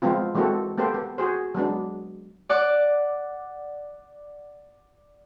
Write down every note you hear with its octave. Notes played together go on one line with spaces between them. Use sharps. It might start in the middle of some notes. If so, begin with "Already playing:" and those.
F3 G#3 B3 C4 F4
E3 G#3 A#3 C4 F#4 A4
A#3 B3 G4 A4 C5
B3
F#4 G#4 C5
F#3 G#3 B3 D4
D5 F#5 D6